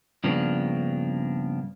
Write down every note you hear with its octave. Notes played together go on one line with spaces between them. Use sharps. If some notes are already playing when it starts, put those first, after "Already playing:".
G2 C#3 F3 A#3 B3 D4